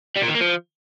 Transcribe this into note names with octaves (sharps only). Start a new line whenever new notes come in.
G3
A#2
D#3
A#3
F3